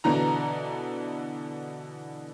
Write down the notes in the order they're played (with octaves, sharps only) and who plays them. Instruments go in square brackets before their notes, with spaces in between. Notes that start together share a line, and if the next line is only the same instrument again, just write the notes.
[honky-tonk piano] B2 D3 E3 A#5